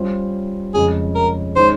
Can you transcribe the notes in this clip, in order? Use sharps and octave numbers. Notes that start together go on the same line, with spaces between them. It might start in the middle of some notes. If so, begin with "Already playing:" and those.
Already playing: G3 C#4 F4 C5
F2 C#3 F3 G#3 C#4 G#4
A#4
D#3 G#3 C#4 C5